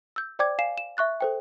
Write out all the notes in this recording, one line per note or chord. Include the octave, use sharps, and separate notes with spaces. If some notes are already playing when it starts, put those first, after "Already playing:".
E6 G6
C5 D5 G5 D6 G#6
F5 G#5 C7 E7
E7
E5 C#6 F#6 A6
A4 C5 G5